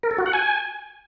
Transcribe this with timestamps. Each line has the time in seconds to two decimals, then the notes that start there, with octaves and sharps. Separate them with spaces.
0.03 A#4
0.11 A4
0.18 F#4
0.26 F#5
0.33 G#5